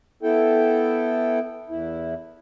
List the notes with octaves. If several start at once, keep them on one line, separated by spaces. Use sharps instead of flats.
B3 E4 A4 G5
E2 E4